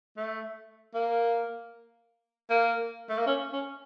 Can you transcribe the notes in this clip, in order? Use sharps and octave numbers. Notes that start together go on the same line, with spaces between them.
A3
A#3
A#3
A3
A#3
C#4
C#4